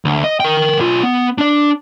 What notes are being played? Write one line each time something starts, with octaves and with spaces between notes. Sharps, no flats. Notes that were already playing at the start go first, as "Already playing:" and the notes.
D2
D#5
A#4 G5
B1 F4
B3
D4 D5